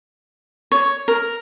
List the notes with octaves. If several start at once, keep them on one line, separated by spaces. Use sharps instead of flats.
C#5
A#4